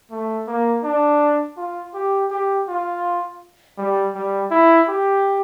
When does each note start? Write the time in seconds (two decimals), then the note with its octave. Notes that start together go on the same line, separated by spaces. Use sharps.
0.11 A3
0.47 A#3
0.83 D4
1.57 F4
1.94 G4
2.30 G4
2.68 F4
3.78 G3
4.15 G3
4.51 E4
4.88 G4